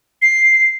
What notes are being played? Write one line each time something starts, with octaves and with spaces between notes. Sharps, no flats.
C7